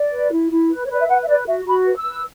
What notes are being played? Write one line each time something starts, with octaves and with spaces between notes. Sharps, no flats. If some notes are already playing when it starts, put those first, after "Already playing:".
Already playing: D5
B4
E4
E4
B4
C#5
B4 D5
E5
B4 F#5
E5
B4 D5
F#4 E5
F#4 B5
B4
E6
B4